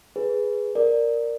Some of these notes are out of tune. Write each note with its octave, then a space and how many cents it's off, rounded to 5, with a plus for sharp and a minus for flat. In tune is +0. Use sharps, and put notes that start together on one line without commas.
G#4 +0 B4 +0
A#4 +0 D5 +0